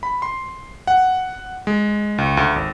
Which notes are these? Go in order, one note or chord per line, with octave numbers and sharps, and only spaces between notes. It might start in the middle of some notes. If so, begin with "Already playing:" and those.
B5
C6
F#5
G#3
C#2
D2
G#1